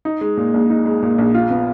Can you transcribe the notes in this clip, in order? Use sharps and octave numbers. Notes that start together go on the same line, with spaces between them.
D#4
G#3
A#2
A#1
D#4
G#3
A#2
A#1
F4
B3